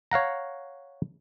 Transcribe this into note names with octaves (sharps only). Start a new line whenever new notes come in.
C#5 F5 F#5 A#5